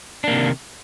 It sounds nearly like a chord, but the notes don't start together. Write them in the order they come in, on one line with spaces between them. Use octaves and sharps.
D4 A#3 C3 D#3